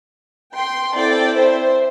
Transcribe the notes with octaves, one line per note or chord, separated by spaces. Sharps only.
G5 C6
C4 E4 A4 D5 G5
C5 E5